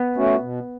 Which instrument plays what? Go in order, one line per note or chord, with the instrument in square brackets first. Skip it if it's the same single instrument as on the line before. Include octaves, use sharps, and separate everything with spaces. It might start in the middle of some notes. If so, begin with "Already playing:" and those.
Already playing: [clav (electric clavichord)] B3
[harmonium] A3 C#4 F#4
B2